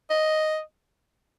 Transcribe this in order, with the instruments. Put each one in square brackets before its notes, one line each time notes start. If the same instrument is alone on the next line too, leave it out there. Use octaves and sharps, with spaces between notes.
[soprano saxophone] D#5